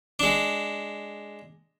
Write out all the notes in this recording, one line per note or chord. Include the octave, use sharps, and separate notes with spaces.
G#3 D4